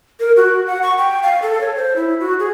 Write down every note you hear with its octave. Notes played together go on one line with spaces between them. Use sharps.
A#4
F#4
F#5
C#6
G5
F5
A4
C#5
C5
E4
F#4
G#4